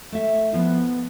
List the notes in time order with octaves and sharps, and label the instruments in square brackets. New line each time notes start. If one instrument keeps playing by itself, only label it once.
[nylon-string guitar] A3 E5
[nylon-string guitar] F3 E4 [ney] B3